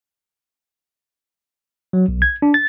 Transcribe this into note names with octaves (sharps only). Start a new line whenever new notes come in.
F#3
B1
G#6
D4
A6